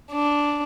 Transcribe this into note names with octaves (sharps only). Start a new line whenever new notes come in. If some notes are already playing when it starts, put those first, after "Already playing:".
D4